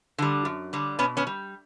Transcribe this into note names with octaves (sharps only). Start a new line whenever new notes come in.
D3 G3
F#2
D3 G3
B2 B3 C#4
B3 C#4
G3